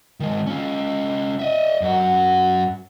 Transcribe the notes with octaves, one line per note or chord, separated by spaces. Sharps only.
D#3 G#3
C#4 F4
D#5 E5
F#2 F#4